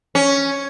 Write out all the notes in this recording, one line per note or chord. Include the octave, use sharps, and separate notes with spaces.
C#4